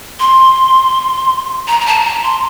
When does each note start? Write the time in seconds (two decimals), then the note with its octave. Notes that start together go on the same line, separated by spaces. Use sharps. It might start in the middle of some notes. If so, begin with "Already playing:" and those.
0.20 C6
1.68 A#5
1.81 A#5
1.86 A5
2.04 A#5
2.23 C6